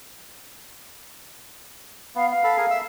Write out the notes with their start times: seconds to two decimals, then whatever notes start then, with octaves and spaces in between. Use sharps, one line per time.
2.15 B3 F5
2.30 F5
2.44 A4 B5
2.57 G#4 A#4
2.70 E5 E6